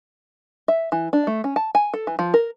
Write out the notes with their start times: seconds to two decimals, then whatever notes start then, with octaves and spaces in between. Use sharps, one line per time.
0.68 E5
0.92 E3
1.13 D4
1.27 A3
1.44 C#4
1.56 A5
1.75 G#5
1.94 A4
2.07 E3
2.19 F3
2.34 A#4